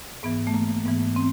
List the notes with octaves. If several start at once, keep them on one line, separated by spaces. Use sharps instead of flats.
G#2 E3 B3
A3
A#3
G#2 E3 B3
C4